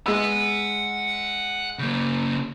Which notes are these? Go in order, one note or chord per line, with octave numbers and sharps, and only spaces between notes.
G#3 F#5 B5 E6
C#3 A#3